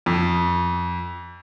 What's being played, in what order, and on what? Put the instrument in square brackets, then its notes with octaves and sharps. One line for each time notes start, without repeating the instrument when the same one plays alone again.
[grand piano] F2